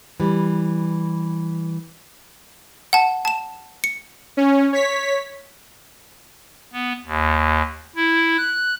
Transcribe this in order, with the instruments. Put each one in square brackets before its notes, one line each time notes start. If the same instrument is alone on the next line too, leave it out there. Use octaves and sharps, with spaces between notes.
[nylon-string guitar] E3 G3
[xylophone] F#5 A5
A5 E7
C#7
[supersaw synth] C#4
C#5 B6
[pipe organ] B3
D#2
E4
F#6